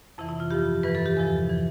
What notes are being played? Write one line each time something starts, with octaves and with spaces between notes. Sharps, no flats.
F2 C3 E3 E4
E4
F4
G2 F3 G4
G2 E3 B4
A4
G4
E2 C3 F3 A4
E3